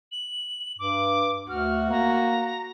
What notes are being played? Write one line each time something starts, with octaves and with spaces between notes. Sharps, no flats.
F#7
G2 D6
D2 F#4 F6
A#3 A#5